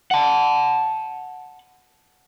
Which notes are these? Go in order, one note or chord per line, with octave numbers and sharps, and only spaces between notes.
F#5 A5